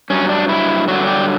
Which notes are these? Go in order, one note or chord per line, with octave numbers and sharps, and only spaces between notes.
G2 F#3 C#4
D4
E4
G2 D3 F#3 F#4
G4